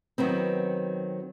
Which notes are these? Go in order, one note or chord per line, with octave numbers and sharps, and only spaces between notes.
D#3 F#3 B3 C4